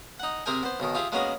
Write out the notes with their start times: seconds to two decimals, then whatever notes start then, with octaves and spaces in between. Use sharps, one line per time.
0.20 D#4 F#5
0.46 C3 C4 G#4 A#4 G5 G#5
0.63 B3 C5
0.80 B1 B2 D#3
0.95 F4 G4 G#4 E5
1.12 G#3 A#3 B3 C#4 F#4 G#4